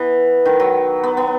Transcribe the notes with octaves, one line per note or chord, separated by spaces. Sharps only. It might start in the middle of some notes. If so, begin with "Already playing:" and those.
Already playing: E3 B3
D#3
F#3
B3
B3